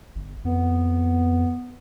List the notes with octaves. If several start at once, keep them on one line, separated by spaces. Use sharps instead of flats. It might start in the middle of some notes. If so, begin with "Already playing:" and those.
G1
F2 B3